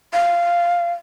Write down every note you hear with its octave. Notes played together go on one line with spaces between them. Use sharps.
F5